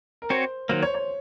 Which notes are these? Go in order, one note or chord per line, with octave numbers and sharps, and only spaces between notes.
A#4
C4 F#4 C5 C#5
D#3 F#3 A#3 C5
C#5
C#5